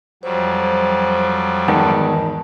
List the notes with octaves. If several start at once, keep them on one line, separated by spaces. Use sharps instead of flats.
F2 F#3 G3 C5
E2 G#2 D#3 A#4 A5